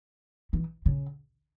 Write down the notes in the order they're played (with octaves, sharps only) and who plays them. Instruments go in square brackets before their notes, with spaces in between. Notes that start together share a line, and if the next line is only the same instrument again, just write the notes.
[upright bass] E3
C#3